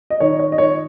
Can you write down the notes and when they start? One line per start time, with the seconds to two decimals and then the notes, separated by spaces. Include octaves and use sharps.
0.10 D#5
0.20 D#3 C#5
0.39 C#5
0.52 D#5
0.58 D#3 C#5